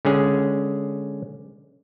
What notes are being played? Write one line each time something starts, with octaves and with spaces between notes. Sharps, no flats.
D3 G#3 C#4 G#4